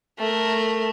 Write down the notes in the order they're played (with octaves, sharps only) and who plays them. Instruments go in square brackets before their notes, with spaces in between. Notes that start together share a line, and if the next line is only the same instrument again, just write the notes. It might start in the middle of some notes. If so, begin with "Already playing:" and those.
[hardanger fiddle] A3 A#4